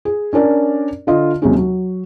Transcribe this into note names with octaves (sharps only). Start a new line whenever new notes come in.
G#4
C#4 D4 A#4 D5
D3 F4 D#5
D#2 C3 F#3 G#3 C#4 D#4
F#3